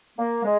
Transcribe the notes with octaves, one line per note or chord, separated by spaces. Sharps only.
A#3
G#3